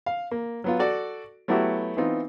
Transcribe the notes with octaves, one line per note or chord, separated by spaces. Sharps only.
F5
A#3
F#3 B3 F4
F#4 A4 D5
F#3 A3 B3 E4 F#4 G4
E3 B3 C4 D#4 F4